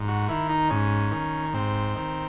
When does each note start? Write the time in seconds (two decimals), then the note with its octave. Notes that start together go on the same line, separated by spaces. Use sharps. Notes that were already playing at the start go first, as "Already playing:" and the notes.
Already playing: G#2
0.08 F#4
0.29 D#3 E4
0.50 D#4
0.70 G#2 C#4
1.11 D#3
1.53 G#2 C4
1.96 D#3